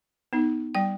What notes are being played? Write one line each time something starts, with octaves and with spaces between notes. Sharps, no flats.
B3 D#4
G3 G5